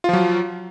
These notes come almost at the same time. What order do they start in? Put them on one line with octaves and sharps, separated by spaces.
F4 F3 F#3